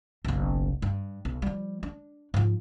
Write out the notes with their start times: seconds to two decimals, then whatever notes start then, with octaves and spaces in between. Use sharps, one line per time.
0.24 F#1 B1
0.82 G2
1.25 B1
1.42 F3 G3
1.83 D4
2.34 G#2 F3